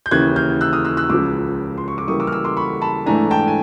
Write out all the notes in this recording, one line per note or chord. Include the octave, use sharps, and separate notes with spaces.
G6
D#2 C#3 E3 F#6 G#6
F6 G6
E6 F#6
D#6 F6
E6 F#6
E6 F#6
C#2 C#3 F3 D6 E6
C6
C#6
D6
C#3 E3 G3 A#3 C#6 D#6
D6 E6
F6
D6 E6
C6 D6
B5 C#6
A5 B5
G#2 E3 A3 D4 G#5 A#5
G5 A5
G#5